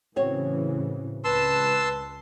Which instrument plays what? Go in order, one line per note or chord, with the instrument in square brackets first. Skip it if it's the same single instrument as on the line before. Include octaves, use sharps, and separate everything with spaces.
[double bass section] A2 C#3 E3 [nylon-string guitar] C4 F#4 C#5
[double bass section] C#2 [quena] B4 [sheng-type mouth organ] A5 C6 E6